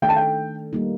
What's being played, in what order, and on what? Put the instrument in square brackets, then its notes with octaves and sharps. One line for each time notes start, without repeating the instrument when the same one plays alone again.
[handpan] D#3 A3 D4 A4 [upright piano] G5
[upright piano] A5
G5
[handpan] G3 A#3 D#4